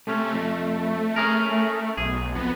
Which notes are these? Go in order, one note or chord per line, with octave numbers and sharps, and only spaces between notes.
C3 A3 C#4
F2
C#4 G#4 A#4
B1 G#4
F2 B3